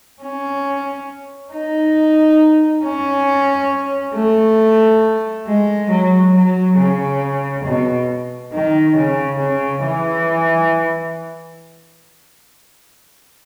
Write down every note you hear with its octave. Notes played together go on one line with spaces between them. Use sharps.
C#4
D#4
C#4
A3
G#3
F#3
F#3
C#3
B2
D#3
C#3
C#3
E3